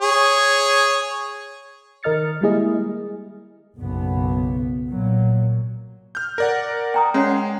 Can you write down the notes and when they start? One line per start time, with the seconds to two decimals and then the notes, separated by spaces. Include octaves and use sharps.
0.02 G#4 C#5
2.03 D#3 A#4 D#5 F6 A6 C#7
2.41 G3 G#3 A#3 E4 G#4 D#5
3.78 F#1 B1 B3
4.90 A#2 F#3
6.15 F6 G6
6.38 A#4 D5 F#5
6.94 G5 A#5 D#6
7.14 G#3 C#4 C#5 F#5